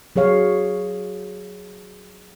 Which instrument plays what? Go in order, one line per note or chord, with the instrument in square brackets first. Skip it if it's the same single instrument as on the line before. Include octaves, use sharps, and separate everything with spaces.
[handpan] F#3 G#4 C#5 F5